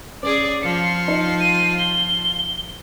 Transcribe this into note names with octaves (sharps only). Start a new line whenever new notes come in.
C#4 G#4 D5 D6
F3 F4 C#7
D#4
D#7
G7